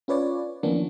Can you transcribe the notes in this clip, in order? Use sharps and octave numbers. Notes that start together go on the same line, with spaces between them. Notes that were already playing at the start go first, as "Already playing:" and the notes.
C#4 F4 B4 C#5 D5
D#3 F3 A#3 B3 C#4 D4